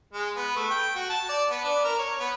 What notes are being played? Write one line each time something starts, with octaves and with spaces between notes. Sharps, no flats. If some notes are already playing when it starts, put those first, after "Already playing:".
G#3
B3
A3
G5
F#4
A5
D5
B3
D4
A#4
C#5
B3